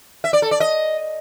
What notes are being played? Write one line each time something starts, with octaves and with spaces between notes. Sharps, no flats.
E5
D5
A4
D5
D#5